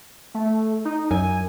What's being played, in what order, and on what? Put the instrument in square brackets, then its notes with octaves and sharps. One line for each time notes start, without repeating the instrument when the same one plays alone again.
[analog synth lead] A3
D#4
[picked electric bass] F#2 [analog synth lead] G#5